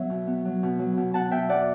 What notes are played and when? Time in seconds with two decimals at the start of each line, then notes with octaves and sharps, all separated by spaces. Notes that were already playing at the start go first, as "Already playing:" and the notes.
Already playing: F#3 B3 E5
0.10 B2
0.27 B3
0.45 F#3
0.63 B2
0.79 F#3
0.97 B2
1.14 B2 F#5 A5
1.31 B2 E5 G5
1.48 E2 D5 F#5